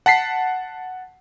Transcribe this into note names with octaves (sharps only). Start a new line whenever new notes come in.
F#5 A5 B6 C7